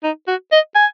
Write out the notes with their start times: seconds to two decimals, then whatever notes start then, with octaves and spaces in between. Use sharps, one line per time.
0.03 D#4
0.27 F#4
0.52 D#5
0.75 G#5